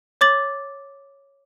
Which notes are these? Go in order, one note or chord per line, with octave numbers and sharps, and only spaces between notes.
C#5 D6 A6 F#7